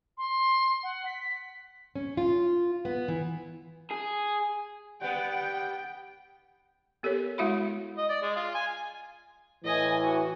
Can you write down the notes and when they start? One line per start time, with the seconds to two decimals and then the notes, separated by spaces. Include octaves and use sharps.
0.18 C6
0.83 F#5
1.06 B6
1.95 C#4
2.17 F4
2.85 B3
3.08 E3
3.91 G#4
5.01 G3 B3 F#5 G5
7.03 B3 G4 A4 A#4 C#5
7.38 G#3 E4 F#4 E5 F5 B5
7.98 D#5
8.09 D5
8.22 G#3
8.36 F4
8.55 G#5
9.64 A2 E3 D#5 G#5
10.03 F#4